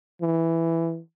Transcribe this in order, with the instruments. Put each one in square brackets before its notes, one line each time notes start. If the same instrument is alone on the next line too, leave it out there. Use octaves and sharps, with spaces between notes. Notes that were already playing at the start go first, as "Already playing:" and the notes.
[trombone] E3